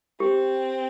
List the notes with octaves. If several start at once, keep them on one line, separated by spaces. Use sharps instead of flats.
C4 G4